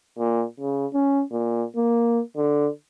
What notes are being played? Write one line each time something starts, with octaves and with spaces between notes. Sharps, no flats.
A#2
C#3
C#4
A#2
A#3
D3